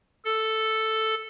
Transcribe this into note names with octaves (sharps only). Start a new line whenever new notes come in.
A4